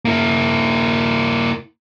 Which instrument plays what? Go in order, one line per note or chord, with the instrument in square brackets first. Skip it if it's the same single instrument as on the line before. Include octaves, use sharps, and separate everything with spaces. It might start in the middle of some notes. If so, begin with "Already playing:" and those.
[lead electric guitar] A#3 E4